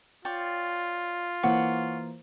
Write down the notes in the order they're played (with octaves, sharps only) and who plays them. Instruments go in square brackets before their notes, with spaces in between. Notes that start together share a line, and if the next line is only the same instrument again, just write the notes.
[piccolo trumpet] F4 [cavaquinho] C#5 D5 G5
[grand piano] E3 A#3 C5 [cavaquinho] C#5 F#5 D6